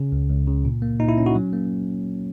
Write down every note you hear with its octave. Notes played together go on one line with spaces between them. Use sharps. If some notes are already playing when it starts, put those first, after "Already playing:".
Already playing: C#3 C#4
C#2
C#2
C#3
A#2
A#3
A#2 D#4
E4
C#4
F#4
F#3
A#3